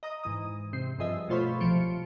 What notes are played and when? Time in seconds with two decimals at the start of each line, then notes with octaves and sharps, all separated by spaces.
0.03 D#5 A#5 D#6
0.24 G#2 E3 D#6
0.73 C3 C4 C7
0.99 G2 F3 G#4 D#5 E5
1.28 B2 A3 F4 C5 C#5 B5
1.60 C2 F3 C5 C#7 D7